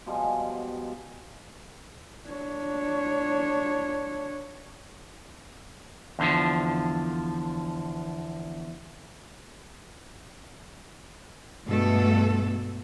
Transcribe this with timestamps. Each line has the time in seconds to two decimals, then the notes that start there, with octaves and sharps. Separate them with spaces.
0.06 B2 F3 G3 G#3
2.29 D4 C#5
6.19 E2 D3 F3
11.66 G2 B2 G#3 A3 A4